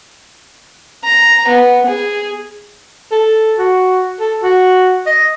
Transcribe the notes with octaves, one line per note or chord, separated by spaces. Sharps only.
A#5
B3
G#4
A4
F#4
A4
F#4
D#5